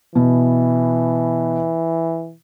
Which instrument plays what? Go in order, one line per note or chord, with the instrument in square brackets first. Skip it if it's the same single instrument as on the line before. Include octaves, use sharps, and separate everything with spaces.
[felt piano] B2 [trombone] E3